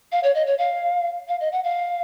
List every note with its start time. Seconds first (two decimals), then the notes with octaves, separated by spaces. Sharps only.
0.12 F5
0.23 C#5
0.35 D#5
0.47 C#5
0.58 F5
1.28 F5
1.41 D#5
1.52 F#5
1.64 F5